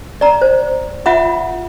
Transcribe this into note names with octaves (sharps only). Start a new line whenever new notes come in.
D5 A#5
C5
F4 E5 F#5 B5